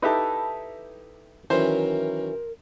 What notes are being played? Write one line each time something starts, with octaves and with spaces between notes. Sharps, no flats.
D#4 E4 G4 A4 B4
D#3 E3 F#3 C#4 A#4 C5